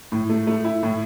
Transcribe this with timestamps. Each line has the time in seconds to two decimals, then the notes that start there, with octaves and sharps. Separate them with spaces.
0.12 A2
0.29 A3
0.47 A3
0.65 E4
0.83 A2